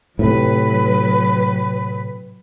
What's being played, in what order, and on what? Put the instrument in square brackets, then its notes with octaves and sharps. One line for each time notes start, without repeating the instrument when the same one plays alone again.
[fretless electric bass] A2 C3 [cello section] F#3 B4